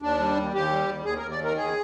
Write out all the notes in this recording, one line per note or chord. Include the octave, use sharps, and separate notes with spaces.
D#2 D4
G3
D#2
D#2 G4
G3
D#2
D#2 G#4
A#4
D#2
D5
D#3 A#4
D#2 G#4